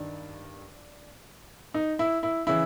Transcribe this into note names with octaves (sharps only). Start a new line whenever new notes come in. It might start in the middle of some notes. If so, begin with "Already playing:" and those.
Already playing: G2 D#3 D4
D#4
E4
E4
C#3 E3 E4